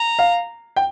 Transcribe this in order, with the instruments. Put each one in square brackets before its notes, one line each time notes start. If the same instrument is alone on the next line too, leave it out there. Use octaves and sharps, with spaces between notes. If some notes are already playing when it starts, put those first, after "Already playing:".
Already playing: [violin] A#5
[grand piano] F5
G5